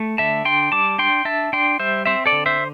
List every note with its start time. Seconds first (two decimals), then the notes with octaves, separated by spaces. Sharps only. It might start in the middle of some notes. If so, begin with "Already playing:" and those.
Already playing: A3
0.18 D3 E5 A5
0.45 D4 G5 C6
0.72 G3 A5 D6
0.98 D4 G5 C6
1.25 D4 E5 A5
1.53 D4 G5 C6
1.79 G3 C5 E5
2.05 C4 C5 E5
2.26 A4 D5
2.32 D3
2.46 C5 E5